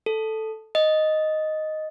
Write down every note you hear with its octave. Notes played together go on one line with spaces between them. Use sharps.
A4
D#5